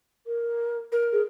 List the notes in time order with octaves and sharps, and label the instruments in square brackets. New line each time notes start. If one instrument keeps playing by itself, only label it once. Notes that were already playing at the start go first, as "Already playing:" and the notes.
[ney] A#4
[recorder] A#4
[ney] G#4